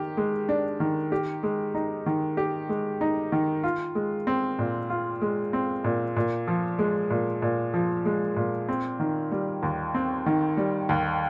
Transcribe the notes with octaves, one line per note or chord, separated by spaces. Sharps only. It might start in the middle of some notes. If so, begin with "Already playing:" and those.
Already playing: D#3 G4
G#3
D4
D#3
G4
G#3
D#4
D#3
G4
G#3
D#4
D#3
F4
G#3
C4
A#2
F4
G#3
C4
A#2
A#2
F3
G#3
A#2
A#2
F3
G#3
A#2
C4
D#3
G3
D#2
C4
D#3
G3
D#2